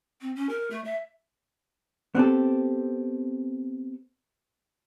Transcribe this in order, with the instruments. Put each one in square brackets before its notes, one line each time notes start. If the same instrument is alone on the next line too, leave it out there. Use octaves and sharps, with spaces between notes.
[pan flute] C4
C#4
A#4
A3
E5
[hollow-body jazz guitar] B3 C4 G4 A4